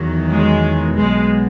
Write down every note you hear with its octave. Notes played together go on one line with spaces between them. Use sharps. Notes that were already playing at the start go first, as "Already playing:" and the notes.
Already playing: E2 D#3 F#3
G#3
B1 B2 F#3 G#3